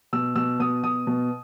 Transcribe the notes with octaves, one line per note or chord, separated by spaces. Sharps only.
B2 E6
B2 E6
B2 D#6
B2 D#6
B2